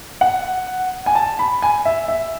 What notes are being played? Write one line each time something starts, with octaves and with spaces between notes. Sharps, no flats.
F#5
G#5
A5
B5
G#5
E5
E5